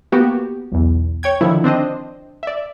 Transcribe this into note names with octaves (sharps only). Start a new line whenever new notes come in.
A#3 B3 F#4 G4
B1 E2
C#5 G5 G#6
D3 D#3 F3 E4
C4 D4 C5 D#5
D5 E5